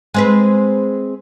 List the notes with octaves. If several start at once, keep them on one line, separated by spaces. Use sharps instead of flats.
G#3 C4 B4